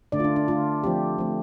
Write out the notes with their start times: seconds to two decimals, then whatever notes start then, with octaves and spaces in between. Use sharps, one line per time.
0.12 D3 A3 D4 D5
0.20 F4
0.24 D4
0.36 D4
0.48 D3 A3 D4 F4
0.83 F3 A3 C4 G4
1.18 F3 A3 C4